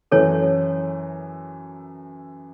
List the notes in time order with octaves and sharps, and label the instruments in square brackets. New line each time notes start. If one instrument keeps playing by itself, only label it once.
[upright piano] F#2 E3 A3 [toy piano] A4 C#5